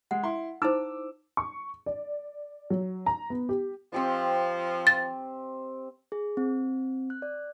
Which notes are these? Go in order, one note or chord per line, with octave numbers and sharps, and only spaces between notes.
G#3 F#5
E4 C6
D#4 E4 C5 D6 E6
C#6
D5
F#3
A#5
B3
G4
F3 C4 G4 D#5
A6
G#4
C4
F#6
D5